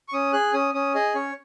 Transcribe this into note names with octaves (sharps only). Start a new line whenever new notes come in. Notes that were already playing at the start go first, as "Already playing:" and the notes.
C#6
C#4 D#6
G#4 F#6
C#4 D#6
C#4 D#6
G#4 D#5
C#4 C#5